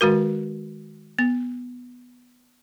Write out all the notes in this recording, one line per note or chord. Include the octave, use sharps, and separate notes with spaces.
D#3 G#3 F#4 A#4
B3